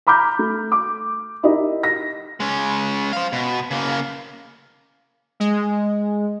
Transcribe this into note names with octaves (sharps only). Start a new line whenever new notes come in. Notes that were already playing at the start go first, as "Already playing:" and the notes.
A#5 B5 D6 F6 G6
A3
D6
D#4 E4 G4 A#4 D#5
A#6
G#3 C#4
C5 F5
B2
C#3 A#3
G#3